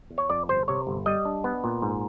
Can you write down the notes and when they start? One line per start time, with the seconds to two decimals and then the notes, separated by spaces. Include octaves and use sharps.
0.10 E2
0.18 C#5
0.30 F2 D5
0.49 G1 C5
0.68 C3 C#5
0.87 G1
1.06 G3 D#5
1.25 D4
1.44 B3
1.64 A#2
1.82 G#2